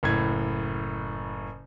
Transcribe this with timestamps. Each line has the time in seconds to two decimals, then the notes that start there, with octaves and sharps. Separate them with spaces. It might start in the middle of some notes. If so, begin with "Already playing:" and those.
0.03 F#1 A2 G#6